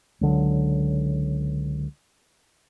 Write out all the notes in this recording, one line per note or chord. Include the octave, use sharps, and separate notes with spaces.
C#2 D3 F#3